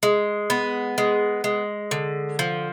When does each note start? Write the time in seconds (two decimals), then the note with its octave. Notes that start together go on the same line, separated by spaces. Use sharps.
0.03 G#3
0.50 B3
0.98 G#3
1.44 G#3
1.91 D3
2.39 F3